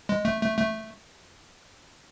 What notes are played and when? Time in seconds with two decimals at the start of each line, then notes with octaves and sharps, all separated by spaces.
0.09 G#3
0.25 A3
0.41 A3
0.58 A3